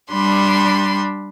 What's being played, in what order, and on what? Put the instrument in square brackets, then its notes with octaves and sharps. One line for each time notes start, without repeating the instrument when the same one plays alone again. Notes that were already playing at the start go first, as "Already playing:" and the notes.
[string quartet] G3 D4 B5 C6